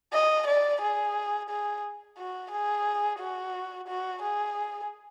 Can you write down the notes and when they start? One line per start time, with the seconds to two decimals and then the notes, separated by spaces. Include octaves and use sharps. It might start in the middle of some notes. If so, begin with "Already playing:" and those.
0.13 D#5
0.48 D5
0.81 G#4
1.50 G#4
2.18 F#4
2.51 G#4
3.20 F#4
3.88 F#4
4.22 G#4